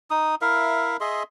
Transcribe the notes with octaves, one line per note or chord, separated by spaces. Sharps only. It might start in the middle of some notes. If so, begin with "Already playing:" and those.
D#4 D#6
E4 A#4 E5 F5
G#4 D#5 E5 C6